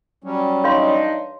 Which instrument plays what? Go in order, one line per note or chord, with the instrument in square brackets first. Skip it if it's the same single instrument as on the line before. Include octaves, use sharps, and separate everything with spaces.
[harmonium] F#3 G3 C#4
[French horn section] G2 D4 D#4 [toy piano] C#5 F5 C6